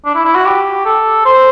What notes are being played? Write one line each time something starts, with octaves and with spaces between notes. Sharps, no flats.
D4
E4
E4
F#4
G4
A4
C5